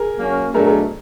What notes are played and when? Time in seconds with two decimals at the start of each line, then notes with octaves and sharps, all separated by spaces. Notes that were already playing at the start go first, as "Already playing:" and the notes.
Already playing: G#4 A#4
0.17 F#3 A#3 C#4
0.54 B2 F#3 A3 D4 G#4 A#4
0.67 G#4 A#4